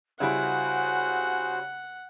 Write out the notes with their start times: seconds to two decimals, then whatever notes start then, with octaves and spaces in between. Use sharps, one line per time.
0.20 C#3 G3 E4 F#4 C5 F#5 G#5